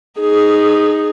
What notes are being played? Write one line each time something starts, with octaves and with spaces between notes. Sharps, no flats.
D#4 G#4